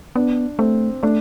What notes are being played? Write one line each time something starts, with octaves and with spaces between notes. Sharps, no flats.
B3 D4
A3 C4
A3 D4